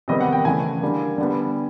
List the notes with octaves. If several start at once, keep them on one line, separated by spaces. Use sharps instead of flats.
C3 D#3 G3 B3 D#5
F#5
G5
C#3 E3 A3 G#5
D3 G3 A#3
D3 G3 B3